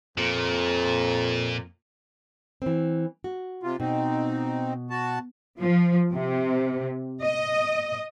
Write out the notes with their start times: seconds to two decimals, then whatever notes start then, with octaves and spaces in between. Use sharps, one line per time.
0.18 F2 A#2
2.62 E3 C4
3.24 F#4
3.63 C3 F4
3.80 B2 C4 D#4
4.90 F#4 A5
5.59 F3
6.13 C3
7.23 D#5